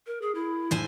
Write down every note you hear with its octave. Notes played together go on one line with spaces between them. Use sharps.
A#4
G#4
E4
A2 C5 G#5